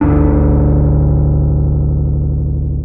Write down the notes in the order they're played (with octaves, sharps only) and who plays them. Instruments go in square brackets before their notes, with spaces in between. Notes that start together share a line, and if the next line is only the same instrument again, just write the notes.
[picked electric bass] D1 G1 D2 D4